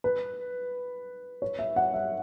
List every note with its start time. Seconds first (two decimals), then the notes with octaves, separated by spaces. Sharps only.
0.04 B4
1.42 C#5
1.59 E5
1.76 F#5
1.94 E5